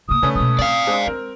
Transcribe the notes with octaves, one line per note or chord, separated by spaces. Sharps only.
C#3 A#3 D#6
C#3 A3 C#4 B4
B2 G#3 D#6
C4 D5 F5
G#3 D4 C5
G#3 C4 A#4